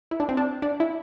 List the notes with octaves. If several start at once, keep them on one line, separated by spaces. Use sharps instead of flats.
E4
D4
C4
D4
D4
E4